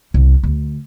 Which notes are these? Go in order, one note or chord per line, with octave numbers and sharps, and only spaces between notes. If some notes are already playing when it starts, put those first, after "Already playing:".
C2
D2